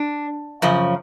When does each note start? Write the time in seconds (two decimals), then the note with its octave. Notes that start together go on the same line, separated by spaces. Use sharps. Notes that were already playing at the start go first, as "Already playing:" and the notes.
Already playing: D4
0.62 F#2 C#3 F3